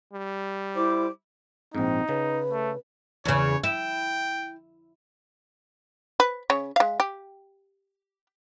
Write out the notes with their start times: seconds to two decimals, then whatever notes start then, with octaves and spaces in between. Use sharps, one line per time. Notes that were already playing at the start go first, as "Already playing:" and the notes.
0.13 G3
0.75 E4 C5 D6
1.75 A#1 G#2 C4 D#4
2.09 C#3 B4
2.52 A3
3.25 E2 C#3 C#5
3.64 E4 G5
6.20 B4
6.50 C#3 C#5
6.76 G#3 F5
7.00 G4